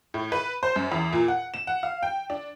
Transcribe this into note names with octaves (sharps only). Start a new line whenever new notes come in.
A2
B4
C5
F#2
E2
A#2
F#5
E7
F#5
F5
G5
D4